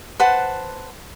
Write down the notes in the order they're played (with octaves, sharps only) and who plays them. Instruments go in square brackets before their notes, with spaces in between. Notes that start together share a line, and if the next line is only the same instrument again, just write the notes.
[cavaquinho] B4 C5 F#5 A5